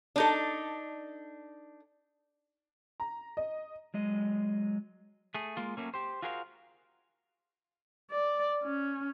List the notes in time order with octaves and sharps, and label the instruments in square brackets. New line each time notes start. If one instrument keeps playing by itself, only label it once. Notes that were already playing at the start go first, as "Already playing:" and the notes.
[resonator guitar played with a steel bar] D4 D#4 A4
[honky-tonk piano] A#5
D#5
[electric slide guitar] F#3 G#3 D#5
A3 G#4
G#3 A#3 F4
F#3 A3 A#3 C#4
G4 C5
F4 F#4 G#4 A#4 C5 F5
[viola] D5
C#4